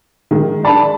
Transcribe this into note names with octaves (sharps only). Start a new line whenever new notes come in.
D#3 G#3
D5 A5 B5